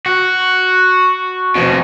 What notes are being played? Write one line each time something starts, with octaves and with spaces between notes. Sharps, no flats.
F#4
F2 B2